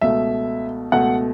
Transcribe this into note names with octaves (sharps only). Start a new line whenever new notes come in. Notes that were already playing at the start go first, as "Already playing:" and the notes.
C#2 B2 A3 E5
C#2 B2 A3 F#5